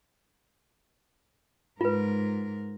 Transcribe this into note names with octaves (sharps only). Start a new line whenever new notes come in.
G#2 F4 A#4 B4